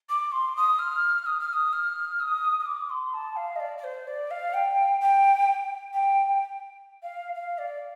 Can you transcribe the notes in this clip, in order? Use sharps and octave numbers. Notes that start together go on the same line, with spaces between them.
D6
C6
D#6
F6
D#6
F6
D#6
F6
D#6
D#6
D6
C6
A5
F5
D#5
D5
D5
C5
D5
F5
G5
G5
G5
F5
F5
D5